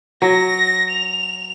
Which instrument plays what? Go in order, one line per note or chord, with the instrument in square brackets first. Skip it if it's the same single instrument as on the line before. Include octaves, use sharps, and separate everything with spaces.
[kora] F#3 [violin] A#6
[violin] F7